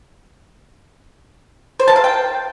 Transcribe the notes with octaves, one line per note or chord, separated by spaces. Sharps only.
C5
A5
F5
G5